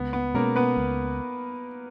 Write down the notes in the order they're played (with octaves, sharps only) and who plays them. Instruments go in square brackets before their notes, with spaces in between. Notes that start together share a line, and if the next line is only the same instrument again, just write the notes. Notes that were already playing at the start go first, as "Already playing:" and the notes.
Already playing: [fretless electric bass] C#2 [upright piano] B3
[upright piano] B3
[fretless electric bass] B2 G#3 C#4 [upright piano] A#3 A#4
[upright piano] B3 B4
[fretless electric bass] C#2